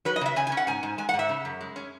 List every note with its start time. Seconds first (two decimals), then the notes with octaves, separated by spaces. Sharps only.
0.05 F#3 B4
0.16 D#5
0.21 C#3 E5
0.36 C#3 G#5
0.47 G#5
0.52 C#4
0.57 F#5
0.67 G#2 G#5
0.83 G#2
0.98 G#3 G#5
1.09 F#5
1.14 G#2
1.19 E5
1.29 C#3
1.45 F#2
1.61 G#3
1.76 C#4